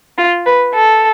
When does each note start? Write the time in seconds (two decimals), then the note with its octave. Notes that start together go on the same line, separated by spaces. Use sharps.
0.18 F4
0.46 B4
0.74 A4